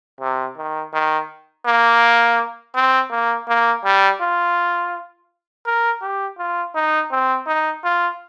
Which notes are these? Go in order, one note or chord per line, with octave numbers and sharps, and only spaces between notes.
C3
D#3
D#3
A#3
C4
A#3
A#3
G3
F4
A#4
G4
F4
D#4
C4
D#4
F4